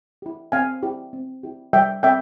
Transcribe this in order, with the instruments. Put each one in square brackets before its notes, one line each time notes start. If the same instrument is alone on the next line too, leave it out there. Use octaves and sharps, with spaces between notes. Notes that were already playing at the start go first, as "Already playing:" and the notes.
[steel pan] E4 G4
C4 F5 G#5
E4 G4
C4
E4 G4
G3 E5 G5
C4 E5 G5